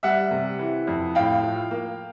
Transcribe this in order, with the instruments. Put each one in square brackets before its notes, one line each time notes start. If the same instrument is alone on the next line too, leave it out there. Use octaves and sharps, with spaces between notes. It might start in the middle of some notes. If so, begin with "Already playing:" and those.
[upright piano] G3 E5 F#5
C3
E3
F2
A2 F5 G5
F3
A#3